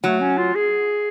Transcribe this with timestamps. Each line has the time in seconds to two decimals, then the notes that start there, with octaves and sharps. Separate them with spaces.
0.04 F#3 A3
0.21 C#4
0.38 F4
0.55 G#4